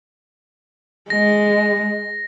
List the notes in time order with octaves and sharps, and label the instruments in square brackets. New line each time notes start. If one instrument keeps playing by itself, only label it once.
[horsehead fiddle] G#3 [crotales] A#6